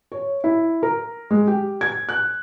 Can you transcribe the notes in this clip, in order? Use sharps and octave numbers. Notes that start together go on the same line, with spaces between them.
C#5
E4
A#4
G#3
G4
G#6
F#6